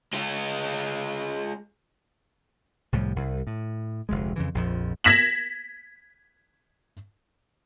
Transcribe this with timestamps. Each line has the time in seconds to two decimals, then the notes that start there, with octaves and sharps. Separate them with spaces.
0.13 G#3 F4
2.92 C2 A2 F3 G3
3.16 C2
3.47 A2
4.09 F1 D2 G#3
4.36 F2 C#3 E3
4.55 A#1 F2 F3
5.04 G#6 A#6 B6 E7 F#7